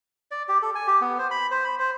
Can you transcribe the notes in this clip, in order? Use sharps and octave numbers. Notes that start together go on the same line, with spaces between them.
D5
G4
A4
G#5
G4
B3
C5
B5
C5
B5
C5